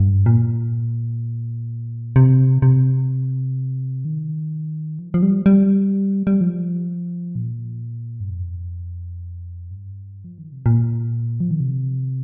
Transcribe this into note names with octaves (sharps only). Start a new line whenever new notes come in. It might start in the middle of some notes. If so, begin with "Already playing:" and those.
Already playing: G2
A#2
C3
C3
D#3
F3
F3
G3
G3
G3
F3
A#2
G2
F2
G2
F3
D#3
C3
A#2
F3
D#3
C3